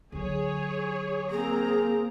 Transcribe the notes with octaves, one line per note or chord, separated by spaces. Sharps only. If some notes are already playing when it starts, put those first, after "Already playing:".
D3 F#3 G#4 C#5
A#3 C4 G#4 A#5